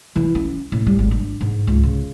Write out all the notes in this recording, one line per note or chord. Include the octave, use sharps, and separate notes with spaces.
E3
C#4
A2
G3
G#1
D4
G#2
C#2
C#3